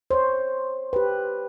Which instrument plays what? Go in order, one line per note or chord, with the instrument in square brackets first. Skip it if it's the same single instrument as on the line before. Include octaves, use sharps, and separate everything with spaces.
[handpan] C5 C#5
G4 B4